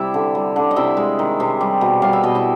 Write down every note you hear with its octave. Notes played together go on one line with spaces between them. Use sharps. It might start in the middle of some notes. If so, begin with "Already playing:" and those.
Already playing: C3 G3 E4 E5
D3
G3
D3
D#5
C3 E4 E5
G#3
D#3
C3
G3
B2
G3 F5
E5
B2 D#5
E4 E5